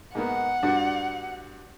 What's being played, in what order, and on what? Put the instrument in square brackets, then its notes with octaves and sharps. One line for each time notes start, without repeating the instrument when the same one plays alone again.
[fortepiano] G#2 A#3 B3 [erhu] F#5
[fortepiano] G2 D4 F#4